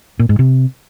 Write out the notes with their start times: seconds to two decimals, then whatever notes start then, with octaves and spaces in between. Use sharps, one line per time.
0.19 A#2
0.29 G#2
0.39 C3